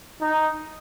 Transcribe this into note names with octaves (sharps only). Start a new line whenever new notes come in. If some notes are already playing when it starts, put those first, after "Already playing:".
D#4